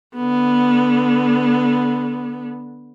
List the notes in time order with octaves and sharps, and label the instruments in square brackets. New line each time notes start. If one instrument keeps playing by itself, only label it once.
[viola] D3 B3